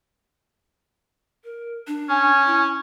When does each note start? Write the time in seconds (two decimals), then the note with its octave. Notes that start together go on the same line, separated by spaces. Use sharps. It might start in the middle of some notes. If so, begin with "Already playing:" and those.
1.45 A#4
1.87 D4
2.10 C#4 G#5
2.46 E4